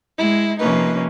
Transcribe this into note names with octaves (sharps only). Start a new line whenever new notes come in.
G#3 E4
C3 F3 A#3 C#4 D#4 B4